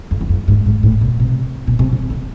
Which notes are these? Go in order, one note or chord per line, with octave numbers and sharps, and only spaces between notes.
F2
E2
F2
G#2
G#2
A2
B2
C3
B2
C3
D3
D3